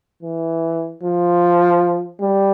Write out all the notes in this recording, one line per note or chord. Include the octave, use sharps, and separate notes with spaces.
E3
F3
G3